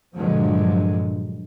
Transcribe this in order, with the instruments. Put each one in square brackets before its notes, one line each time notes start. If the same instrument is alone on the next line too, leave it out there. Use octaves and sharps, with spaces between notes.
[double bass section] G2 A#2 D3 F3 F#3 G#3